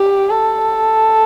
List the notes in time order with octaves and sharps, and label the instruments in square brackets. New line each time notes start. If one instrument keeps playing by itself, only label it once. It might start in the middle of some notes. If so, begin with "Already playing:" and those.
Already playing: [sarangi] G4
A4